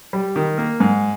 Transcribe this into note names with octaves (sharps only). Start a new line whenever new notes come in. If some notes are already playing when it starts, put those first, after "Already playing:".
G3
D#3
A#3
G#2